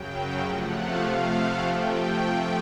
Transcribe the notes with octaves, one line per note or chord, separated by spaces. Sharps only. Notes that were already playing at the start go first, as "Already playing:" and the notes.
Already playing: F#2 C#3 F#3 G5
G5
C3 F3 A3 F#5
F5
C3 F3 A3
F#5
C3 F3 A3 G5